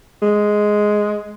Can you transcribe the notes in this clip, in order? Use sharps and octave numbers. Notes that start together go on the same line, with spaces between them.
G#3